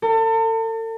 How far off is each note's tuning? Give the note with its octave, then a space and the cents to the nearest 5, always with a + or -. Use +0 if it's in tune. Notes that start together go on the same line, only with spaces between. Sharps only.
A4 +40